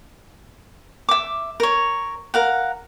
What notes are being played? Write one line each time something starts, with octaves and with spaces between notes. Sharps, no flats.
E5 D6
A#4 C#5
A#4 F5 F#5